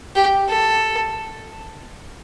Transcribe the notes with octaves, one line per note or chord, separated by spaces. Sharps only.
G4
A4